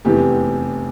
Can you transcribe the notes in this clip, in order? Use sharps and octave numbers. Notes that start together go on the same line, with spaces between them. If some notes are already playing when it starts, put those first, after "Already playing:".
F1 E2 C3 E3 G4